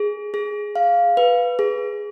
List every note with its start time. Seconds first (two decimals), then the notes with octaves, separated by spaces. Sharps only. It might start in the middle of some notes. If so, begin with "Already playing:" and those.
Already playing: G#4
0.34 G#4
0.76 F5
1.17 B4
1.59 G#4